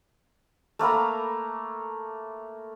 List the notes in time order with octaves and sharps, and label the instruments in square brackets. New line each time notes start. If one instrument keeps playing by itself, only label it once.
[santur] A3 A#3 A#5 B5